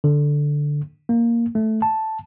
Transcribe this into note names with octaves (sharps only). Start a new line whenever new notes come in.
D3
A#3
A3
A5